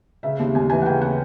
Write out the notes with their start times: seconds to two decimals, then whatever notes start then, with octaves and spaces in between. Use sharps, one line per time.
0.23 C#3 E5
0.39 D#2
0.55 D#2 G#5
0.70 E3 G#5
0.82 F#5
0.85 C#3 G5
1.01 F#5